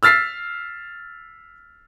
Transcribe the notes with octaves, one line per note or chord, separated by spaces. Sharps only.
E6 F6 A6 B6 C7